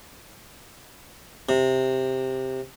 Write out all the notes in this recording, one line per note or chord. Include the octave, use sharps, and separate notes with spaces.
C3